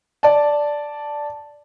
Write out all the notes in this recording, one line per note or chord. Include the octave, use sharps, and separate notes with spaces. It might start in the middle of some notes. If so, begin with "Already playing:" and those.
D5 A5